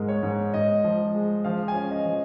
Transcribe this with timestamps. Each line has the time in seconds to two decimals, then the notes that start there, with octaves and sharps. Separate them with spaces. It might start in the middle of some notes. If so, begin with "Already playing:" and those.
Already playing: G#2 G#3 A#4
0.08 C#5
0.23 G#2
0.54 G#2 D#5
0.84 F3
1.15 G#3
1.44 F3 F5
1.68 G#5
1.75 C#4
1.91 D#5
2.05 F3